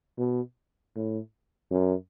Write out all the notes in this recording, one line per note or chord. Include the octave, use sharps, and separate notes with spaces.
B2
A2
F#2